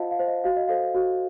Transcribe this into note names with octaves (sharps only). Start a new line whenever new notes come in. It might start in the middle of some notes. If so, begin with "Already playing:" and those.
Already playing: F4 C5 D#5 F5 F#5 A5
F5
C5
D#5
F#4 F5
D#5
A4 C5 F5
F#4